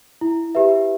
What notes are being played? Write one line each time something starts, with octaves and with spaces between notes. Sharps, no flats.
E4
G4 B4 E5